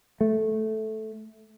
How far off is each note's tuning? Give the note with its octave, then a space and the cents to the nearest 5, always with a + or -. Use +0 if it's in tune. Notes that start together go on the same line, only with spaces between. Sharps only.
A3 -10